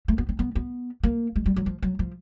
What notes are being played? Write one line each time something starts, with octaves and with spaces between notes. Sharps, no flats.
A3
B3
C4
B3
B3
A#3
G#3
G3
F#3
F3
F#3
F3